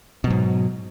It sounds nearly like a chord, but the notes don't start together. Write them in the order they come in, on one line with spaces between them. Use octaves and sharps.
B2 F#3 G#2